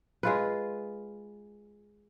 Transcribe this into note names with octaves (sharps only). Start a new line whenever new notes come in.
G#3 F4 B4